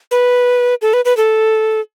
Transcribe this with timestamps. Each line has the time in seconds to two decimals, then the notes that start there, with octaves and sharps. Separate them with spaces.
0.11 B4
0.82 A4
0.93 B4
1.05 B4
1.17 A4